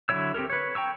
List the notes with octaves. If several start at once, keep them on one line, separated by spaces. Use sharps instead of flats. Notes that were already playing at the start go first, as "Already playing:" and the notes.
D3 F#3 E4 C#5 E6
C4 G4 A4 A#4
B4 C#5
G5 A#5 C#6 E6